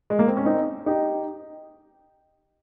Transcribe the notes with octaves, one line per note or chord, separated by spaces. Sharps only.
G#3
A#3
C4
C#4
C4 D#4
D#4 G4